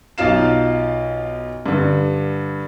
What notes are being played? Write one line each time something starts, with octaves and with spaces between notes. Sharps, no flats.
B1 D#4 F4 F5 E7
G2 D3